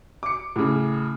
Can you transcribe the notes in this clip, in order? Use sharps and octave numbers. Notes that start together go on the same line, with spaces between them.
D6 C#7
A2 C#3